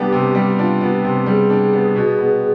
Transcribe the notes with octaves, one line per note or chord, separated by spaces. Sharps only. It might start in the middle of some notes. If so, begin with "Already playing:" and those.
Already playing: C3 G3 B3 D4 G4
C3
G3
D4 F4
B3
G4
C3
G3 G#4
D4
B3
B2
B3